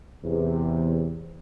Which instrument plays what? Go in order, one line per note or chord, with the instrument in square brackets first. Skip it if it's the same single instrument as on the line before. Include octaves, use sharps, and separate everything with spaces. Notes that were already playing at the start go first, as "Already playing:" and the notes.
[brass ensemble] E2 C3